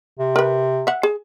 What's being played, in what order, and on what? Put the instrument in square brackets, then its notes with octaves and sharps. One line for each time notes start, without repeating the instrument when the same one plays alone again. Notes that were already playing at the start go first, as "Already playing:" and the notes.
[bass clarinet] C3
[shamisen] A#4 B4
E5 F#5
G#4